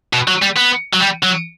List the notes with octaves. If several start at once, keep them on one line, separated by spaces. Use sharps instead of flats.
B2
F#3
G3
B3
F#3
G3
F#3